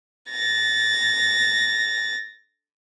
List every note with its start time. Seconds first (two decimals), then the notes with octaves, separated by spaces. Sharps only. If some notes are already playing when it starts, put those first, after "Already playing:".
0.30 A6 A#6